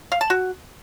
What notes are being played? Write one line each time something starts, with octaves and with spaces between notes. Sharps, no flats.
F5
A5
F#4